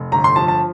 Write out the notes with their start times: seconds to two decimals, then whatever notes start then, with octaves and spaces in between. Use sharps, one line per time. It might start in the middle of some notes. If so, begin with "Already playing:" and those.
Already playing: F1
0.12 G1 A#5
0.24 C6
0.36 F3 A5
0.48 A5